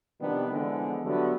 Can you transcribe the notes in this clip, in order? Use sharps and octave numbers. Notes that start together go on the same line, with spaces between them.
C3 D#3 F3 G3 B3 D4
D3 E3 F3 G#3 B3
D3 F#3 G3 A3 B3 D4